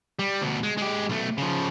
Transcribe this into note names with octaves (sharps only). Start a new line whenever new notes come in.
G3
D2 B2
G#3
G#3 G4
B1 A3
C#3 F3